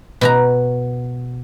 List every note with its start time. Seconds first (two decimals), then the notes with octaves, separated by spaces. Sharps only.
0.21 B2 F#4 A#5